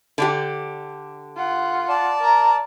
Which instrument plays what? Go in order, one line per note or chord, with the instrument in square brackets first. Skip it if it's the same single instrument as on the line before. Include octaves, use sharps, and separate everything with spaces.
[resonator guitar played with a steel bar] D3 D4 G4
[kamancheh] F4 F#5
[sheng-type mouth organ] D5 A5
[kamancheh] A#4 A#5